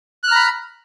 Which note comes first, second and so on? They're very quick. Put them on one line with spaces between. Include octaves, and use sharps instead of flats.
F#6 F6 A#5 B5